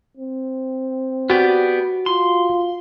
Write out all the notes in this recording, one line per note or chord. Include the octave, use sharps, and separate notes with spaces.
C4
B3 F#4 G4 D5
F4 C6